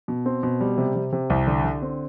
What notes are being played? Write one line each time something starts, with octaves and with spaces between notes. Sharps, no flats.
B2
C4
B2
G3
C3
C3
C3
C2
D3
D3
C4